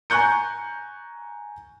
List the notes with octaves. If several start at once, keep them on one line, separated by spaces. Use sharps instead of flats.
G#5 A#5 C#6 F#6 G6 C#7